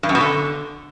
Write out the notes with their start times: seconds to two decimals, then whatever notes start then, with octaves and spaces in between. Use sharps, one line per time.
0.03 G2
0.09 F#2
0.15 B2
0.21 D3